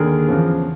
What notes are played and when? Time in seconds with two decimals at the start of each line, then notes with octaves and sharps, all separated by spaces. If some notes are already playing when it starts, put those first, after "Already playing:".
Already playing: D#2 D3 G#4 A#4
0.28 E2 C#3 F3